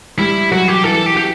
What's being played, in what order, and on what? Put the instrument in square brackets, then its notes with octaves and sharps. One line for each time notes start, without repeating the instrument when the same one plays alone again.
[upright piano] G3 [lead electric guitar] E4
[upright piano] F#3 [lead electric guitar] F#4
[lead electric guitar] G4
[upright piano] E3 [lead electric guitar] A4
[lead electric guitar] A4
G4
G4